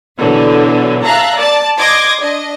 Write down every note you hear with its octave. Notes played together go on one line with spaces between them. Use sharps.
B2 D3 E3 F#3
E5 F5 A5 A#5 F#6
D5 A5
D#5 C6 D6 G#6 A#6
D4 D#5